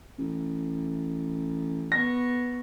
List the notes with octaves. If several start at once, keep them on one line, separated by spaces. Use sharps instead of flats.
A1
B3 C#6 A#6